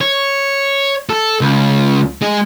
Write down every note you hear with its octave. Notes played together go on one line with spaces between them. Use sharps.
C#5
A4
C#2
G#3